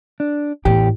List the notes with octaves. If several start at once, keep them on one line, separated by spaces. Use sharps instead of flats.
D4
A1 E2 A2 G4